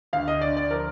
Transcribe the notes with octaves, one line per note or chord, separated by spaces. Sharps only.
D2 F5
D#5
D3 D5
D5
F3 A#4